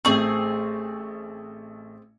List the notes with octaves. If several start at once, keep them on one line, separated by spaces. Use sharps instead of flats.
A1 A3 C4 G#4 C#6